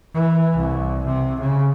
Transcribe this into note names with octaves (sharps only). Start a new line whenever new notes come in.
E3
C2
C3
C#3